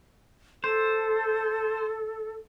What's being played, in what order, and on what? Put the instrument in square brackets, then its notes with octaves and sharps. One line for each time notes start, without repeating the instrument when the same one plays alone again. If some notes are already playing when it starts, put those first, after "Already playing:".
[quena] A4 [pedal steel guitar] C5